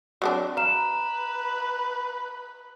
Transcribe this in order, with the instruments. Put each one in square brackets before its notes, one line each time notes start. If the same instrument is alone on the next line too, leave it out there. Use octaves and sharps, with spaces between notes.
[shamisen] F#3 C4 D4
[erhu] B4 [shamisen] F5 [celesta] A#5 E7